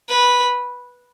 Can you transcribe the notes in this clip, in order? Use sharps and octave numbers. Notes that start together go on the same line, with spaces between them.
B4